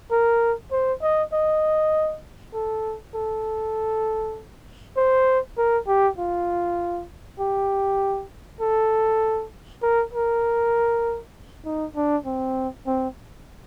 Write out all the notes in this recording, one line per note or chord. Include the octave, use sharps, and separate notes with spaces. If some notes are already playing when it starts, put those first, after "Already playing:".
A#4
C5
D#5
D#5
A4
A4
C5
A#4
G4
F4
G4
A4
A#4
A#4
D#4
D4
C4
C4